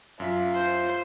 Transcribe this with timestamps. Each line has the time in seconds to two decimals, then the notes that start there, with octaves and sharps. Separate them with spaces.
0.20 F#2 F4 E5 B6
0.54 C5